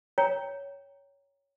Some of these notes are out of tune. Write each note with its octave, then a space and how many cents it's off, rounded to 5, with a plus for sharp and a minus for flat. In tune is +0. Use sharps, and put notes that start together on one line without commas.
C#5 +10 G5 +0 A#5 +0